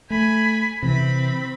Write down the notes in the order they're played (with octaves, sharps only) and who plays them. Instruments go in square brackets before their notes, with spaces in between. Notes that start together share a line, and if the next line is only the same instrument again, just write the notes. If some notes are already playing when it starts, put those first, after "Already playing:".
[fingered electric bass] A3 [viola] G#5 B5
[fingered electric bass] C3 E3 [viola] C4 B5